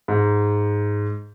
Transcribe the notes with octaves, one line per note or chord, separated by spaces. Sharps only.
G#2